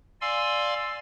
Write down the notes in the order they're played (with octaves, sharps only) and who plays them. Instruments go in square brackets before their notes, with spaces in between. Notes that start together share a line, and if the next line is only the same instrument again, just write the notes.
[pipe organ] D5 F5 G#5 C6 E6